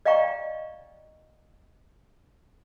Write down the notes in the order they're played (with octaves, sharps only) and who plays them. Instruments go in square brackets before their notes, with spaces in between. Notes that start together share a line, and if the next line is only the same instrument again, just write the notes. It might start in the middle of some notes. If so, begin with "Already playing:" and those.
[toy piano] D5 D#5 F5 G5 A#5 C#6